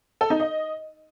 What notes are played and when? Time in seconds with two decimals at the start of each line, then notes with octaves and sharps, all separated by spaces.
0.21 A4
0.30 D#4
0.40 D#5